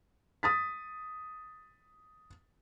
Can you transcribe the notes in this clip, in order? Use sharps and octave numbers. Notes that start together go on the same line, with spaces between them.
D#6 A6 B6